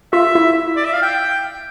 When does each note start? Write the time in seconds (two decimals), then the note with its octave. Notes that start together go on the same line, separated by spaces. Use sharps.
0.12 F4 E5
0.35 E4
0.76 D5
0.85 E5
0.93 F5
1.02 G5